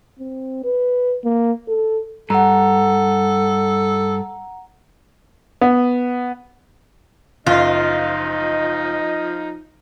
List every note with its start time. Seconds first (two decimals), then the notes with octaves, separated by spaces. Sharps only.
0.20 C4
0.64 B4
1.24 A#3
1.68 A4
2.30 G2 A4 F#5 A#5
5.61 B3
7.47 F#1 F3 D#4 F4 D#5